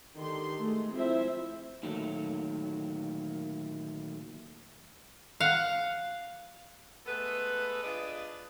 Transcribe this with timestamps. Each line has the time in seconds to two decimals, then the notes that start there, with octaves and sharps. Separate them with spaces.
0.17 D3 D#3 G4 C6
0.60 G#3 A3
0.92 F3 C4 E4 C5 E5
1.83 A#2 D3 D#3 F#3 A3
5.40 F5 F#5
7.06 G#3 A3 B3 A4 B4
7.83 D4 F4 G#4 B4 D5 D#5